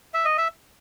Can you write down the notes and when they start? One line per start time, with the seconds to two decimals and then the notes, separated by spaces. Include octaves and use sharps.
0.14 E5
0.25 D#5
0.38 E5